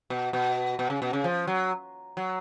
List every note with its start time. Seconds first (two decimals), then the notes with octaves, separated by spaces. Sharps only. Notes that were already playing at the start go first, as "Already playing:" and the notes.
0.10 B2
0.33 B2
0.79 B2
0.90 C#3
1.02 B2
1.13 C#3
1.24 F3
1.47 F#3
2.17 F#3